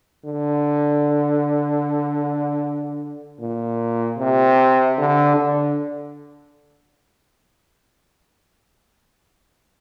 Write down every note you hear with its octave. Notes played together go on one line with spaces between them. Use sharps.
D3
A#2
C3
D3
D3